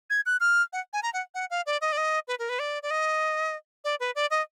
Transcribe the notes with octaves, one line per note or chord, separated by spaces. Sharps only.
G#6
F#6
F6
F#5
G#5
A#5
F#5
F#5
F5
D5
D#5
D5
D#5
B4
A#4
B4
D5
D5
D#5
D5
B4
D5
D#5